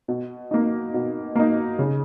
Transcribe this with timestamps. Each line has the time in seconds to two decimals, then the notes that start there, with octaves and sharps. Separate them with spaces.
0.08 B2
0.51 A#3 D#4
0.94 B2
1.36 A#3 D#4
1.79 C#3